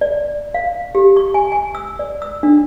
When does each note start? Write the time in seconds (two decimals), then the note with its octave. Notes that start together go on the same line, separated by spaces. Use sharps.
0.01 D5
0.54 F5
0.95 G4
1.16 C#6
1.34 G#5
1.52 G#5
1.75 E6
1.99 D5
2.22 E6
2.43 D4